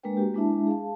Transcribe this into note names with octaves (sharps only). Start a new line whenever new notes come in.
G#3 A#3 D4 A#4 B4 G5
A#3 F#4 G4
G#3 D4 E4 E5 A5
G#4 F5 A5